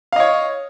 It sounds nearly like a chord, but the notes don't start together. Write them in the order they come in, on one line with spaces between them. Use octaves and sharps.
F5 D#5 C#5